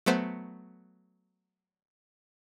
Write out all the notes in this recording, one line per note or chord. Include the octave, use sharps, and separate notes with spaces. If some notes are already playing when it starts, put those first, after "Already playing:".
F#3 A3 B3 C5 F#5